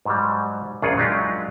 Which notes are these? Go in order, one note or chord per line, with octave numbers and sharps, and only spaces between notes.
G#2 F#3 G3
A#1 F#2 C#3 F4 G#4 F#5
F#3 G#3 D4 D#4 F4 G4